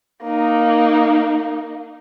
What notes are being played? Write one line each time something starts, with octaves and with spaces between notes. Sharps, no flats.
A#3 D#4